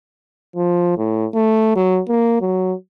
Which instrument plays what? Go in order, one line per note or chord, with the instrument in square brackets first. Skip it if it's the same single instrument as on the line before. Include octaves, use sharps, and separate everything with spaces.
[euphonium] F3
A2
A3
F#3
A#3
F#3